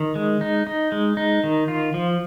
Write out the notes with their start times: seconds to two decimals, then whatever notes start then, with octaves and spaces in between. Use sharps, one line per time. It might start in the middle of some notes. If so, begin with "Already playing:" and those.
Already playing: D#3
0.15 G#3
0.41 D#4
0.67 D#4
0.92 G#3
1.17 D#4
1.44 D#3
1.68 F4
1.94 F3